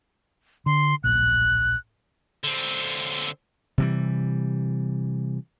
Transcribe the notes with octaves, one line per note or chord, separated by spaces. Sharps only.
D3 C6
D1 A#1 F#6
D3 C4
C3 E3 G3